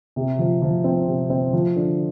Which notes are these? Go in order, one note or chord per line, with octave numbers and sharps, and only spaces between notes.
C3
F3
F3
C4
C3
C4
F3
D3